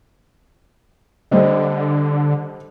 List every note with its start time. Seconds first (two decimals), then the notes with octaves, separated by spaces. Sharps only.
1.31 D3 G3 C5 D#5